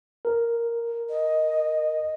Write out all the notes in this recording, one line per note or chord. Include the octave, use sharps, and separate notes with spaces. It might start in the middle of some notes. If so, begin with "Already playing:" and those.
A#4
D#5